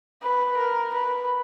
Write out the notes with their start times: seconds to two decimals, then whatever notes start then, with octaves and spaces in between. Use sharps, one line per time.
0.22 B4
0.57 A#4
0.94 B4